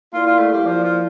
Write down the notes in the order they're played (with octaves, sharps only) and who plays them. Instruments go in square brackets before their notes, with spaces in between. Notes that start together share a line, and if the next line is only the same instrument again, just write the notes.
[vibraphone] A#3 E4 A#4 D5 F5 [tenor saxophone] F4
[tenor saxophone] F4
A3
G3
F3
F3